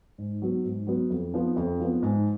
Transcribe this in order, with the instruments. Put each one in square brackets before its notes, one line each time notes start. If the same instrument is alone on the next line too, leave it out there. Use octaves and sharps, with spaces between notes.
[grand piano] G#2
F#3 B3
G#2
F#3 B3
F2
F3 B3
F2
F3 B3
G#2